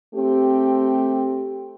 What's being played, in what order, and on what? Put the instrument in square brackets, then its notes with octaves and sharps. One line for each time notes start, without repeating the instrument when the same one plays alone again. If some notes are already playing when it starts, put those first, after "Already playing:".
[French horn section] A3 C4 G4